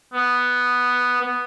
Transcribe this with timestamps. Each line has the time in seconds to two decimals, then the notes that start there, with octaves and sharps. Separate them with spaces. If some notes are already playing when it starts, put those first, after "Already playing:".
0.13 B3
1.22 B3